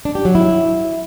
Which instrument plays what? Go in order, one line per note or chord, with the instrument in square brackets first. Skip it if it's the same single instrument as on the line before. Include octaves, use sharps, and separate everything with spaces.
[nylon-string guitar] D4
G4
F#3
E4